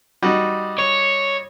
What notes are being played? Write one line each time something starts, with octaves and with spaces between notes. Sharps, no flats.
G3 D#4 F#4
C#5